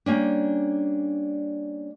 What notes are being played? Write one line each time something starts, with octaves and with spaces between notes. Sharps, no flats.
G3 A#3 C#4 D4